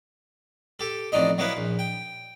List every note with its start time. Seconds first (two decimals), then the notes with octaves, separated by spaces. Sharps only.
0.80 G4 A4
1.12 A1 F2 D4 D#4 D#5
1.38 F#3 A#3 B3 E4 B4
1.57 A#1
1.79 G5